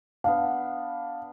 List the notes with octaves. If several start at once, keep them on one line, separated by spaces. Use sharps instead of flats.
B3 D4 F5